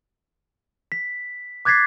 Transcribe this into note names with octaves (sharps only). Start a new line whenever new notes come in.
B6
D6 F#6 G#6 A6 B6 C7